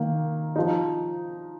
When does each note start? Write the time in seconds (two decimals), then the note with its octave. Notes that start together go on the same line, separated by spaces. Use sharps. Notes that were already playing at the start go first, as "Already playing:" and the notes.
Already playing: D#3 A#3
0.56 F3 D#4